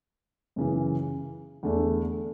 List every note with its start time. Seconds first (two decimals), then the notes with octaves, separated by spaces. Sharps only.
0.56 F#2 C#3 E3
1.63 E2 D3 A3